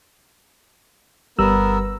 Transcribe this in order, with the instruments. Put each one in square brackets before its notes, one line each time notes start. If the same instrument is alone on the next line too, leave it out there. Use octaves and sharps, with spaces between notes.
[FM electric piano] G1 G3 E6 [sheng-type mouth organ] B3 A#4